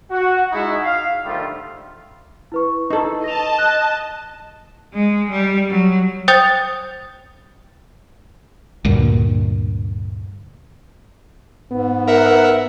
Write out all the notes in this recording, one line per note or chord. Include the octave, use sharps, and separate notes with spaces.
F#4
G#3 D#4 E4 F#4 G#4 E5
F5
D3 D#3 F3 G3 A3 F4
E4 B4 C#6
D#4 A4
D#5 A5 A#6 F7
F#6
G#3
G3
F#3
C5 G5 D#6 G6 A6 F7
D2 G2 A#2
G#2 B3
A#4 E5 F#5